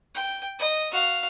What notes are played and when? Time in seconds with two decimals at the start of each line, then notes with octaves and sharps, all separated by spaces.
0.14 G5
0.59 D#5
0.91 F#4 F5